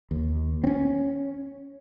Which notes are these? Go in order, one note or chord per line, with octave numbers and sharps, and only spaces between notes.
D#2
C4 C#4